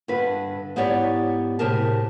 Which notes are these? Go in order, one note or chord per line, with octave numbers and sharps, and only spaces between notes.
G2 D3 B4
G#2 B3 E4 G4 C#5 D5
A2 C3 G4 G#4 A#4 A5